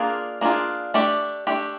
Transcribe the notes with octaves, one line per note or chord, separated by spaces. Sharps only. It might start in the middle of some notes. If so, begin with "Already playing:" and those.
Already playing: A#3 D4 F4 G#4
A#3 D4 F4 G#4
A3 D4 G4
A3 D4 G4